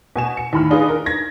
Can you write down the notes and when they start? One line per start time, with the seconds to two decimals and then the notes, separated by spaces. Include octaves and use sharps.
0.16 B2 G#5 E7
0.37 C#7
0.53 D#2 A2 B5 F6
0.70 D4 D#4 F4 G#4 B4
0.89 A#4
1.06 G#6 A#6